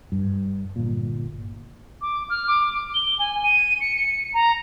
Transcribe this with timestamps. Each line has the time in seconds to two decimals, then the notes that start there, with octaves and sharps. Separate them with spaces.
0.12 G2
0.76 G1 A#2
2.02 D6
2.30 F6
2.47 D6
2.95 G7
3.19 G#5
3.43 D#7
3.81 C#7
3.96 C#7
4.34 A#5